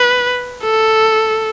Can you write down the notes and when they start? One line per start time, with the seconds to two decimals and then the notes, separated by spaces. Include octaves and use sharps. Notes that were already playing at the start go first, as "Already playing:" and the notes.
Already playing: B4
0.63 A4